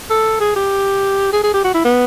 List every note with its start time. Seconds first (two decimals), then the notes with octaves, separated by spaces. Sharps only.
0.10 A4
0.40 G#4
0.56 G4
1.33 G#4
1.43 G#4
1.54 G4
1.64 F#4
1.74 E4
1.85 B3